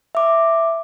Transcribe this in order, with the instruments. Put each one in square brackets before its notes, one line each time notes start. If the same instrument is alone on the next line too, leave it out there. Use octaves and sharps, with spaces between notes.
[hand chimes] E5 D6